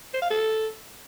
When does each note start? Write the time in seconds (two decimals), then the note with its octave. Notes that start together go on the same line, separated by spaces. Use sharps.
0.13 C5
0.22 F5
0.30 A4